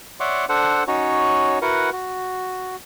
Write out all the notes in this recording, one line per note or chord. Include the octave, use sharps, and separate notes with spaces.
C#5 D5 E5 F#5 C6 D6
D4 A4 C5 F#5
C#4 D#4 F#4 C#5
E4 F#4 A#4 B4 F#5
F#4